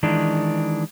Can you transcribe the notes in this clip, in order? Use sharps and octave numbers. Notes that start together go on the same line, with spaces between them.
D#3 E3 G#3 D4